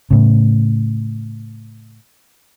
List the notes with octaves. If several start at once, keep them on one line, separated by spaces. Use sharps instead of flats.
A2 C#3